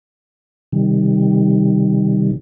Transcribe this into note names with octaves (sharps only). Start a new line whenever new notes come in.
C3 D#3 G3